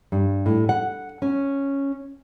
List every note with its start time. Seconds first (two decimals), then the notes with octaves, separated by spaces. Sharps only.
0.12 G2
0.46 A2
0.69 F#5
1.22 C#4